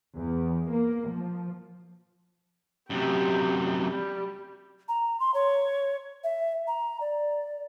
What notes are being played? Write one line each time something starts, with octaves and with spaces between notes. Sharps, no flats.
E2
A#3
F3
F#2 C3 G4
G3
A#5
C6
C#5
E5
A#5
D5